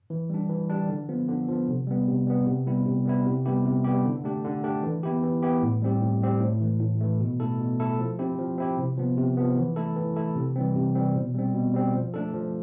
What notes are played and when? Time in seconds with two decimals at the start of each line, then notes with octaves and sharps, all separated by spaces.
0.10 E3
0.30 G3 D4
0.49 E3
0.69 G3 D4
0.89 D3
1.09 F3 B3
1.28 D3
1.48 F3 B3
1.68 C3
1.87 G3 B3
2.08 C3
2.27 G3 B3
2.46 C3
2.66 G3 B3 E4
2.86 C3
3.05 G3 B3 E4
3.26 C3
3.45 G3 B3 E4 G4
3.66 C3
3.85 G3 B3 E4 G4
4.05 D3
4.24 A3 D4 G4
4.44 D3
4.64 A3 D4 G4
4.83 E3
5.03 B3 E4 G4
5.23 E3
5.43 B3 E4 G4
5.62 A2
5.82 G3 C4 G4
6.02 A2
6.22 G3 C4 G4
6.41 A2
6.60 E3 A3
6.81 A2
7.00 E3 A3
7.21 B2
7.40 A3 E4 A4
7.59 B2
7.80 A3 E4 A4
7.99 F3
8.19 C4 E4 G4
8.39 F3
8.58 C4 E4 G4
8.78 C3
8.98 F3 B3
9.18 C3
9.37 F3 B3
9.57 E3
9.76 A3 E4 A4
9.96 E3
10.16 A3 E4 A4
10.36 C3
10.56 E3 G3 C4
10.76 C3
10.95 E3 G3 C4
11.15 B2
11.35 G3 C4
11.54 B2
11.74 G3 C4
11.93 F3
12.14 A3 D4 A4
12.34 F3